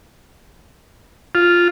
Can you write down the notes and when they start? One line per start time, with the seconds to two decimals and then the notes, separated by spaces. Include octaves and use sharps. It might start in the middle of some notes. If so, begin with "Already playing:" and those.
1.35 F4